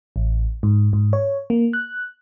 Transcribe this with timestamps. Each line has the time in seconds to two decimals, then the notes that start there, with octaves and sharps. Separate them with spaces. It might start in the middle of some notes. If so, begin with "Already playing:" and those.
0.16 A1
0.63 G#2
0.93 G#2
1.13 C#5
1.50 A#3
1.73 F#6